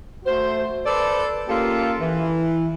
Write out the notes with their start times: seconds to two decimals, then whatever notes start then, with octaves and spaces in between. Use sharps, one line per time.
0.24 A3 F#4 C5
0.86 A4 B4 C5 D5
1.48 A#3 C#4 F4 G4 A4
2.00 E3